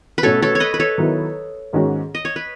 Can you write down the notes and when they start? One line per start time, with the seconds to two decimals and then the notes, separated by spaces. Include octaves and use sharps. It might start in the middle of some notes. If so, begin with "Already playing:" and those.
0.18 B4
0.23 B2 A3 C#4 F#4 A4 C#5
0.42 A4 C#5
0.55 C#5
0.60 B4 D#5
0.74 B4
0.80 A4 C#5
0.98 D#3 F#3 B3 E4
1.73 G#2 D#3 G#3 C#4 F#4
2.15 D#5
2.25 C#5
2.36 B4